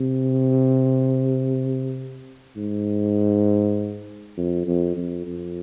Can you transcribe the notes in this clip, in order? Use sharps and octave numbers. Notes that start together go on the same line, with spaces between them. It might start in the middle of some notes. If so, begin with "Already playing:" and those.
Already playing: C3
G#2
F2
F2
F2
F2